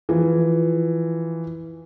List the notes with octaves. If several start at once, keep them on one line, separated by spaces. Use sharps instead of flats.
E3 F3